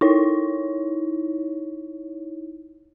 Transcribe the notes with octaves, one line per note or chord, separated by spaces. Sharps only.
D#4 E4 C#5